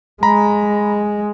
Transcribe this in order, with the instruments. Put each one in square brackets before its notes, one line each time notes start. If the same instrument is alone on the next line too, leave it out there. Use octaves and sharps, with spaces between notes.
[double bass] G#3 [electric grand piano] A#5 B5